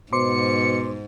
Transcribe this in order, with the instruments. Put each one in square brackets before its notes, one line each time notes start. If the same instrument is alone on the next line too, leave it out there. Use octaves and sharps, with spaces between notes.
[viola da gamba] G#2 [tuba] B2 [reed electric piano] C5 C6 D6 [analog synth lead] C#7